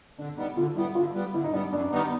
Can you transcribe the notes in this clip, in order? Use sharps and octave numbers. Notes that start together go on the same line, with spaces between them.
D3 D4
G3 B3 D#4
D3 F4
G3 B3 E4
D3 F4
G3 B3
D3 E4
D#4
G3 B3 D4
F#2 D4
D#3 G3 B3 D#4